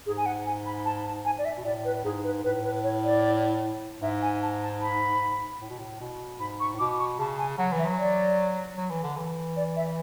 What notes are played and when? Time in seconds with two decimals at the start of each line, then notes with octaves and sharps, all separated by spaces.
0.06 G#2 G#4
0.17 G#5
0.26 F#5
0.46 G#5
0.66 B5
0.85 A5
1.05 A5
1.25 G#5
1.38 D5
1.45 E5
1.57 B2
1.64 A2 D5
1.85 B4
2.04 G#2 G#4
2.24 B4
2.44 A2 B4
2.64 B4
2.83 C#5
3.03 D5
4.02 G#2 E5
4.22 G#5
4.42 A5
4.62 A5
4.81 B5
5.61 A2
5.70 B2
5.79 A2
6.01 B2
6.40 G#2 B5
6.60 C#6
6.75 A2
6.79 B2 D6
6.99 C#6
7.19 C#3 A5
7.38 G#5
7.58 F#3 F#5
7.73 E3
7.79 E5
7.86 F#3
7.98 D5
8.77 F#3
8.91 E3
9.03 D3
9.18 E3
9.56 D5
9.76 E5